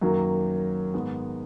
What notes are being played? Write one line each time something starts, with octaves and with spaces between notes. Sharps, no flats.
F#2 D#3 F#3 A#3
G#2 D#3 G#3 B3